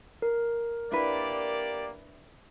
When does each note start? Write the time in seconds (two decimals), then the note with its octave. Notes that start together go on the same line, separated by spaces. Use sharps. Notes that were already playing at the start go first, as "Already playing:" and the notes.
0.22 A#4
0.92 A#3 D4 E4 G4 B4 D5